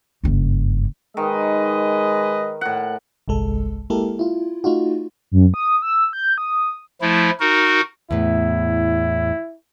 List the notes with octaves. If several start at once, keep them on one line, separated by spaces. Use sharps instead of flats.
F#1 G2
D#3 G#3 B4 D#5
A2 F#5
G1 C2 G#3 A4
G#3 A#3 E4 G4 A4 A#4
E4 F4
A3 D#4 F4 F#4
F#2
D#6
E6
G6
D#6
F3 A3 E4
D#4 F#4 A#4
E2 A2 E4